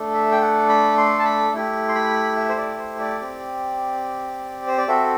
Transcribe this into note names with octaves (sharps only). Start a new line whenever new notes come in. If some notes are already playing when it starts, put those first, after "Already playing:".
Already playing: A3 D4 A4
E5
G5
F#5
B5
C6
A5
B5
A3 E4 G4
C6
B5
E5
C5
D5
C5
D5
C4 G4
C5
D5
C4 F#4 A4 E5